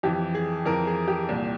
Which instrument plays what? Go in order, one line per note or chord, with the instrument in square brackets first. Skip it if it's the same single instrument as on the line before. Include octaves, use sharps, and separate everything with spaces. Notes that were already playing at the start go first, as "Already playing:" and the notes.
[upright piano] F2 E3 G4
G#4
F2 E3 A#4
G#4
G4
C2 A#2